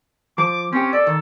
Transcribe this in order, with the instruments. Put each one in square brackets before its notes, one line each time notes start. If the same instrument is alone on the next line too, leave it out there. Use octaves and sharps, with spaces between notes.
[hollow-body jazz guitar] F3 [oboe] D6
[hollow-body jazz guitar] C4 G4 [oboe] C#4
[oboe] A4 [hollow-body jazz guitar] D5
[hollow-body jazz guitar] D#3